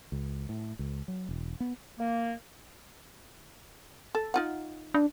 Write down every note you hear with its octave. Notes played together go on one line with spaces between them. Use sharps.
C#2
A2
C#2
F#3
E1
B3
A#3
A4
D#4 F4 F#5
D4